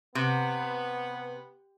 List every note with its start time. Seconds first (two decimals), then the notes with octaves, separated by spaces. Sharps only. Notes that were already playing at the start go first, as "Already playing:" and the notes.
0.15 C3 B3